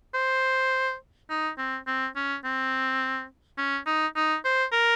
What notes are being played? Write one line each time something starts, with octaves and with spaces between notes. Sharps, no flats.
C5
D#4
C4
C4
C#4
C4
C#4
D#4
D#4
C5
A#4